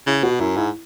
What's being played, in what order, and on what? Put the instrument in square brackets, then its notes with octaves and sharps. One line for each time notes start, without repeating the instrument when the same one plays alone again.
[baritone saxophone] C#3 [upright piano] E4
[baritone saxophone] B2 [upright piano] F#4
[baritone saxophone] F#2 [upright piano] E4
[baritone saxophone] G#2 [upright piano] E4